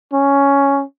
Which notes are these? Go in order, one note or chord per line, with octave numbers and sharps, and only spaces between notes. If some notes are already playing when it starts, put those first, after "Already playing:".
C#4